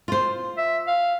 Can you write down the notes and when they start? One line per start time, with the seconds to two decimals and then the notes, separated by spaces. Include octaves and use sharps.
0.08 F4 C5
0.57 E5
0.87 F5